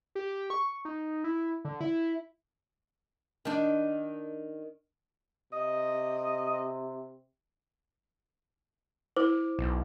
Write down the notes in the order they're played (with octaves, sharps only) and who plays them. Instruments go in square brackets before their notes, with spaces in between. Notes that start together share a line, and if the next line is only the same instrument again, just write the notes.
[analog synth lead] G4
C#6
D#4
E4
D3
E4
[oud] D#3 D4
[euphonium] C3 [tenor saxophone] D#5
[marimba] E4 [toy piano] C5 [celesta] D6
[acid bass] B1